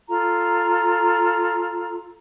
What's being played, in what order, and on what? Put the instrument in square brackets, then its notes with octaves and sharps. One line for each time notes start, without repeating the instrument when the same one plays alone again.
[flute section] F4 A4 A#5